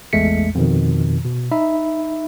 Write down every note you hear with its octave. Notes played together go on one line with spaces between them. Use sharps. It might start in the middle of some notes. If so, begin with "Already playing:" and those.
A1 E2 G#3 A3 B6 C#7
F2 B2 D#3
B2
D#4 E5 B5